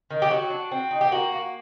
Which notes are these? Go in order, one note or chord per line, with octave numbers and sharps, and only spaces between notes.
D#3
G4
F#3 F#4
D4
C4
D#4
G4
A#3 F#4
A#3